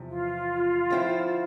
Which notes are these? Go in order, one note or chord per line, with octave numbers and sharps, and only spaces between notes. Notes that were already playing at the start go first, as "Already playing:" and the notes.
Already playing: E2 C3 F3
F4
D3 F3 C4 E4